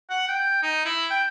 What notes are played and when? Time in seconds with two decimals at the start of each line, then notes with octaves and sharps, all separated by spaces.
0.10 F#5
0.28 G5
0.63 D#4
0.86 E4
1.10 G5